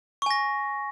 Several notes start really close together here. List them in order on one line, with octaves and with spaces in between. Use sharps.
C#6 G#5 A#6